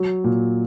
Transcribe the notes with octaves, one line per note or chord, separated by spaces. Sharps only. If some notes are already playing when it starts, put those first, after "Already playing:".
Already playing: F#3
A#2